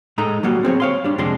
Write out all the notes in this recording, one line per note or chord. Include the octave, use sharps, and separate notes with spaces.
A2 G#3 A3 D#4 A#5
F#3 G3 A#3 F#4
B3 C4 G#4 C#5
C#5 F5 C6
G3 D4
F2 C3 G#3 D4 C6